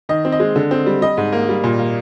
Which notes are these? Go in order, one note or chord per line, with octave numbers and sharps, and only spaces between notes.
D#3 D#5
C4
D#5
G#3
D3
C4
G3
G3 D#5
G#2
A#3
G3
A#2
A#3